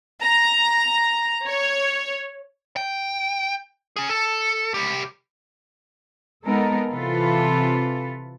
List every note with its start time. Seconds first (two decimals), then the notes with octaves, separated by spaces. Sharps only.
0.22 A#5
1.46 C#5
2.76 G5
3.96 C#4 G#4
4.09 A4
4.74 C2 G4
6.45 G#3 B3 D#4 A4 A#4
6.92 C3 E3 F4 A4 B4